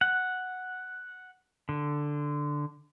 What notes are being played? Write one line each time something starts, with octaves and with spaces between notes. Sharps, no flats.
F#5
D3